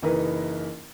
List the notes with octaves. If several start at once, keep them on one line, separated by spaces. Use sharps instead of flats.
F#1 E3 D#4 E4 A#4 B4